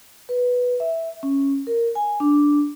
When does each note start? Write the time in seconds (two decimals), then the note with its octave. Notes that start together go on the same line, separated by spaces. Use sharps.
0.29 B4
0.80 E5
1.23 C#4
1.67 A#4
1.95 G#5
2.20 D4